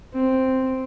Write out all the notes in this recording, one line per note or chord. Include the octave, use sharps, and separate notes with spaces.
C4